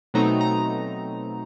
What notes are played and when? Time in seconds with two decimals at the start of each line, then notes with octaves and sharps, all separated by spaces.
0.14 B2 F#3 A3 C4 D#4 A#5
0.41 A#5